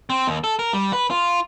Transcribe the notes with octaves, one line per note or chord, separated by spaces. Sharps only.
C4
D#2
A4
A#4
G3
B4
F4